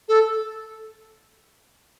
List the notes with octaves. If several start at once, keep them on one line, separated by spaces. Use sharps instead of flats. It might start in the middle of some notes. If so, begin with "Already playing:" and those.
A4